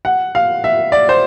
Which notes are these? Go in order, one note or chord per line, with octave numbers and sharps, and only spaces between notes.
F#5
F5
E5
D5
C5